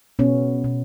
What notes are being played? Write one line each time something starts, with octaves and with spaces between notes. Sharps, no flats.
B2 B3 C#4
B2